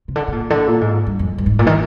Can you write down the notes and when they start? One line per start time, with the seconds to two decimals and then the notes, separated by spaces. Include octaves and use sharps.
0.08 C3
0.16 D3
0.28 C3
0.32 A#2
0.50 D3
0.68 A#2
0.81 G#2
1.07 G2
1.19 F2
1.38 G2
1.46 G#2
1.59 A#2
1.67 D#3